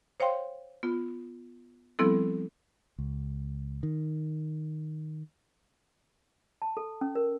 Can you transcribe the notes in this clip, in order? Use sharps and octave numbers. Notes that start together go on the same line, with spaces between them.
C5 C#5 F5 G5 C6
B3 F4
F3 G3 B3 C4 E4 A4
C#2
D#3
A5
A4
C#4
A#4